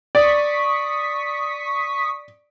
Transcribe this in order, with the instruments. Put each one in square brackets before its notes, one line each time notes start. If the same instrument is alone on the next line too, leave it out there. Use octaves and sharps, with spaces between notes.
[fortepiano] D5 [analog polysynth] C#6 D#6 B6